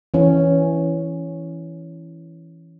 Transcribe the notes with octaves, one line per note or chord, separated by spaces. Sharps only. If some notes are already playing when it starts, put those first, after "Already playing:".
E3 C#4